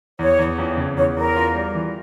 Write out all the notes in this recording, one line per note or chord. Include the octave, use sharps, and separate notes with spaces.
E2 C#5
E2
F2
C#3
E2 C#5
E2 A#4
F4
G3
E3